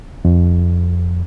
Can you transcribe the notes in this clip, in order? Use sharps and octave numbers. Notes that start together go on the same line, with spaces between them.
F2